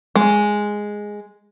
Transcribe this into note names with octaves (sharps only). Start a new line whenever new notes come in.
G#3